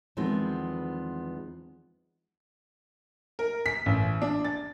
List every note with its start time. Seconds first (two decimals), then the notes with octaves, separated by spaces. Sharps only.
0.17 E2 D#3 F3 G#3 B3 C4
3.39 A#4
3.66 B6
3.86 A1
4.22 D4
4.45 A6